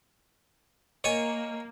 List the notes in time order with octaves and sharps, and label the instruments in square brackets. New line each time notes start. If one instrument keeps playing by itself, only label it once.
[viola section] A#3 [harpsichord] C#5 G#5 [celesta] D#5